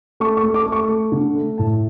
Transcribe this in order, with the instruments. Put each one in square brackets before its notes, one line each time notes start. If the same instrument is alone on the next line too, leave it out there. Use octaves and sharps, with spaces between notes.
[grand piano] A3 C#6
C#6
A3
D6
A3
C#6
A3
D3
A3
A2 A5